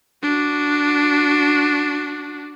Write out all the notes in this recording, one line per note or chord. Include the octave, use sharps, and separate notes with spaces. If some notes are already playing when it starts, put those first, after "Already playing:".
D4 F#4